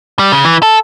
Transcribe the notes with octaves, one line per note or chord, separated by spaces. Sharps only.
G3
C#3
E3
A4